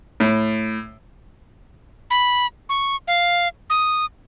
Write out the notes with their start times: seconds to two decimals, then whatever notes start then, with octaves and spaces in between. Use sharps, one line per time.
0.20 A2
2.11 B5
2.69 C#6
3.08 F5
3.70 D#6